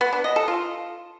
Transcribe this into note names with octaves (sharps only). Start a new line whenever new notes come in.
B3
D4
D#5
A4
F4